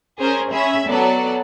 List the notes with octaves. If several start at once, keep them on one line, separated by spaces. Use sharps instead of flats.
C#4 G#4 A#4 C5
C#4 G#4 E5 B5
F#3 B3 A4 D5